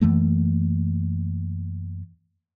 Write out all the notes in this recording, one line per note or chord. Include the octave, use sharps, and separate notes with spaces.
F#2 E3 A3 A#3